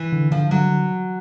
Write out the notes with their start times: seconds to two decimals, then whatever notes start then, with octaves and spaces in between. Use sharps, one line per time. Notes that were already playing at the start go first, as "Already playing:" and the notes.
Already playing: E3
0.12 D3
0.31 D3 F3
0.51 D3 F#3